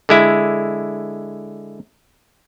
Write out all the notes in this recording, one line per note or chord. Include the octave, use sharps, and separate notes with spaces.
D3 G#3 E4